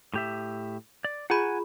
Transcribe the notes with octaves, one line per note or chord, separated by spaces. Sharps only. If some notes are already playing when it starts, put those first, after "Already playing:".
A2 G4 E5
D5
F4 G#4 F#5 G#5 B5